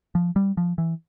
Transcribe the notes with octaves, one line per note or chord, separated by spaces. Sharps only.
F3
G3
F3
E3